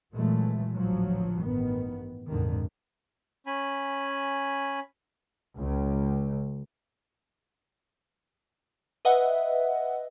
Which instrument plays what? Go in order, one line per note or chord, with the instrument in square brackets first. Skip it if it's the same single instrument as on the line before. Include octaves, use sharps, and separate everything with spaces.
[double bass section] A#2 E3 F#3 G#3 A3
A1 D2 F3 F#3
A1 G2 D#3 B3
A#1 F2 G#2 D3 D#3
[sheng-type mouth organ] C#4 G#5 B5
[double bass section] C#2
[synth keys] B4 D#5 E5 F#5